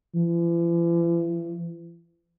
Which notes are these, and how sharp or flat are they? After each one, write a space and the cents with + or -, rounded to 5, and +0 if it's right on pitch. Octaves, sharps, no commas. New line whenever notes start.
E3 +45